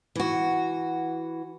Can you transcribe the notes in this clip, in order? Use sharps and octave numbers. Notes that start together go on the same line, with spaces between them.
E3 F#4